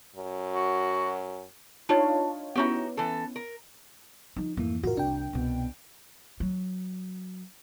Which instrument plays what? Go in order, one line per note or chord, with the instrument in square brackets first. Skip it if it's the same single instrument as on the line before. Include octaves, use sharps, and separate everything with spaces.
[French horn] F#2
[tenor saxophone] F#4
[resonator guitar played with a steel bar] D4 [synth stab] D#4 F4 C#5
[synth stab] B3 C#4 E4 [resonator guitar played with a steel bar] D#4 F#4 G4
[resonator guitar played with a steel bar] E3 A4
A#4
[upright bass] F3 D#4
[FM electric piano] F2 G#2 E3 [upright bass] A3 A#3
[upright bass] A2 F4 [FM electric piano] F#4 A#4
[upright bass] C2 [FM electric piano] D4 G5
[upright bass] C2 B2
F#3